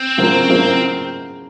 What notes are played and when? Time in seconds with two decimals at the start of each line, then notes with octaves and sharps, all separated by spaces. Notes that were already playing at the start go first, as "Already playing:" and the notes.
Already playing: C4
0.18 C#3 F#3 A#3 F4 C5
0.49 C#3 F#3 A#3 F4 C5